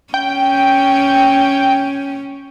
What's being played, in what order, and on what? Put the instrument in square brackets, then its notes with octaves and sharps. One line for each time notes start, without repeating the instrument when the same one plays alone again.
[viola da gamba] C#4 [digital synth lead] G5